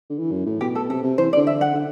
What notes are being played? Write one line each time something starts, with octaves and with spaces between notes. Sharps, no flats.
D3
E3
F#2
A2
B2 G4
A4
C3 A4
C3
E3 C5
D5
D3
E5
F#5
D3